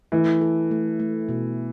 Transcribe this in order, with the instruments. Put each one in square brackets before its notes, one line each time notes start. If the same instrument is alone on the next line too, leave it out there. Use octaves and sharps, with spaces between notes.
[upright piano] E3 [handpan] A3
[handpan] A4
A3
A3
B2